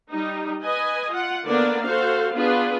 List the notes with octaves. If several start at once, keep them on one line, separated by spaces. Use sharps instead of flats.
G3 D#4
B4 D#5 G#5
F4 F#5
D3 A#3 B3 D4 A#4 D5
F#4 A4 C5 F5
B3 D4 F4 G#4 B4